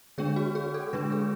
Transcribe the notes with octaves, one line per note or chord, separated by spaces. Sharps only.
D3 G#3 D4 G#4
F#4
G#4
A4
D3 G#3 D4 B4
G#4